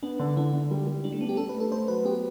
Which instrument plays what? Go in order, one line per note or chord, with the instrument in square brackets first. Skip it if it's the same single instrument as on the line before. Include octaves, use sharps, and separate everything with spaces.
[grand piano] B3 [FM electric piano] D4
[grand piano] D3
[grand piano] D3 [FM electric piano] E4
[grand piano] D3
G3
G3
[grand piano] G3 [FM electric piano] D4
[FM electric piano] A3
[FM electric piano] B3 [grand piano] D4
[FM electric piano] G4
[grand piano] D4 [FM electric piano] A4
[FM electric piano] B4
[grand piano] A3
[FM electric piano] A4
[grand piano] A3 [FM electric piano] C5
[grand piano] F#3 [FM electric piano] B4
[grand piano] B3 [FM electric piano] G4